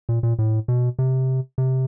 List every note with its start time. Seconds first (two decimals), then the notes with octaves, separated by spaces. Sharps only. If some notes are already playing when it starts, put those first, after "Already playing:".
0.09 A#2
0.23 A#2
0.39 A2
0.68 B2
0.99 C3
1.58 C3